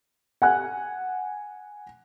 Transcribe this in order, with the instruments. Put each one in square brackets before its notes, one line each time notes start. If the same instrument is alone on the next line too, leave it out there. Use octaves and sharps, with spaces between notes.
[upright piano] F#5 G#5 F#6